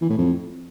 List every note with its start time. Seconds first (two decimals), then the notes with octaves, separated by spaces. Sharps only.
0.01 E3
0.10 A2
0.18 F2